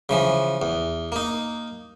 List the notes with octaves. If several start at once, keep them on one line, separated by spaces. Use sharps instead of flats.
C#3 E3 F3
E2
A#3 D#4